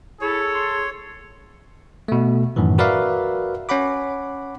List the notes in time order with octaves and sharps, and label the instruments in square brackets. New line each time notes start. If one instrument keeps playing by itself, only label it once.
[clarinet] E4 [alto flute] G#4 [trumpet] A4 [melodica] C#5
[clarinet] C6
[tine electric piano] B2 A3
F#2 A2 D#3 E3
F#4 A#4 B4 D5 E5 F5
C#4 C#5 F#5 B5 D6